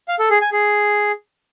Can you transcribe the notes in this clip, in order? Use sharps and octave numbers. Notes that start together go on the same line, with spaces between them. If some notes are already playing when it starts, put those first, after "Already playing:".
F5
A4
G#4
G#5
G#4